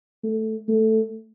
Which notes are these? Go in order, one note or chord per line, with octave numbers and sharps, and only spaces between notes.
A3
A3